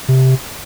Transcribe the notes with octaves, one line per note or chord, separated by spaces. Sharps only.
C3